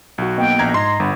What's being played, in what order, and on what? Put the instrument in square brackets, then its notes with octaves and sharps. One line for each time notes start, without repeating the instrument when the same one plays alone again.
[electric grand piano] B1 F#4
[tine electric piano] A#3 B3 D#5 [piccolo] G5
[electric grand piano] A#1 A#5 G#6
[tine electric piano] G#2 D#5 A#6 [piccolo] A#5 [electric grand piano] C6
[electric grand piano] G1 [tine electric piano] G2 F#5 B5